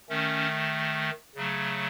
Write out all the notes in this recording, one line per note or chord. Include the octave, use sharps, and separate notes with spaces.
D#3 A3 C#4
C#3 F#3 A3